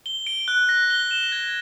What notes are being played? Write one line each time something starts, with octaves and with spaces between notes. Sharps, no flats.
G7
D7
F#6
A#6
G7
E7
G#6